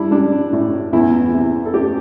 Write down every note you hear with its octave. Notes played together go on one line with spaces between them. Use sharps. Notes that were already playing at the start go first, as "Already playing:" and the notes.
Already playing: G3 D4 E4
G3 D4
A2
E2 E4
C3
A4
A3 G4